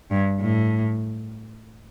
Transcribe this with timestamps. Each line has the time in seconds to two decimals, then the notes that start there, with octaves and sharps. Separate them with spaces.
0.11 G2
0.39 A2